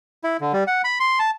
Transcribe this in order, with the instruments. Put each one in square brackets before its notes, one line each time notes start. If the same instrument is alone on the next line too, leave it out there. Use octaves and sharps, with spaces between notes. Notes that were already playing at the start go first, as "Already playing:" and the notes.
[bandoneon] E4
D3
G3
F#5
B5
C6
A5